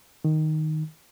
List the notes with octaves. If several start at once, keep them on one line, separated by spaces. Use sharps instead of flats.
D#3